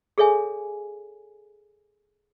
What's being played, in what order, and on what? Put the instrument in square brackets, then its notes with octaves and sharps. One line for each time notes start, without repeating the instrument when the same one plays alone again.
[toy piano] G#4 A4 C#5 E5 G#5